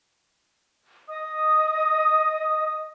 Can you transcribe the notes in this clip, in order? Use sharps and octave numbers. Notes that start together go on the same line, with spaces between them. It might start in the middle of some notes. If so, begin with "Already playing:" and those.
D#5 D#6